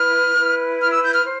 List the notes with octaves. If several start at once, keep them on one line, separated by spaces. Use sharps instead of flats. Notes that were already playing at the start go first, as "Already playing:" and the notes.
Already playing: E4 B4 F6
E4 B4
F6
E6
G6
F6
C5